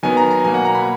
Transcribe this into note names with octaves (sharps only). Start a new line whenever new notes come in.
D#3 F#3 B3 G#5
A#5
A#5
B2 F#3 A#3 G#5
F#5
A#5
B5